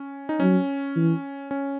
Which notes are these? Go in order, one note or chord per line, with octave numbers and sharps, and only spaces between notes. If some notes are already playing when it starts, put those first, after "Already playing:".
Already playing: C#4
D#4
F#3 C#4
E3
C#4